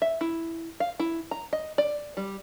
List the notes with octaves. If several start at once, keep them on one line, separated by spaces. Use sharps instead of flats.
E5
E4
F5
E4
A#5
D#5
D5
G3